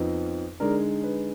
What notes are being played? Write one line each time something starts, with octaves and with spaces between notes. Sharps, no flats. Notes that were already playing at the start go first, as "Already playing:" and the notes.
Already playing: F2 F3 B3 D#4
D3 G#3 D#4 A#4 D5
B4